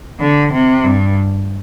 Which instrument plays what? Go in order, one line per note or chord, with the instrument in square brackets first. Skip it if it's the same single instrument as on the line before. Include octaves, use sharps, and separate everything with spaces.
[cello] D3
C3
G2